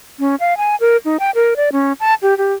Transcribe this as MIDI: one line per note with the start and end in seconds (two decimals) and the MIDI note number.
0.19 0.35 61
0.40 0.57 77
0.57 0.76 80
0.81 0.97 70
1.05 1.17 63
1.20 1.31 79
1.35 1.54 70
1.56 1.70 74
1.72 1.93 61
2.00 2.14 81
2.22 2.37 67
2.38 2.53 67